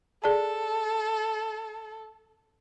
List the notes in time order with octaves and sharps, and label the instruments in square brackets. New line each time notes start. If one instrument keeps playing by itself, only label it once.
[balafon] G#4 D5 A5 [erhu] A4